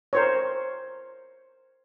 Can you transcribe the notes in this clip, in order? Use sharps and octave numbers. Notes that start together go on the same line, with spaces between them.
A#4 C5 C#5